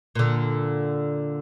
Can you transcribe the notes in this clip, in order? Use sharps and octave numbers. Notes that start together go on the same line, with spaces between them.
A#2 D3